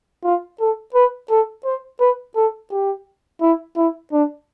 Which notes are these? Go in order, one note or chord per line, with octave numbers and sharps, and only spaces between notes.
F4
A4
B4
A4
C5
B4
A4
G4
E4
E4
D4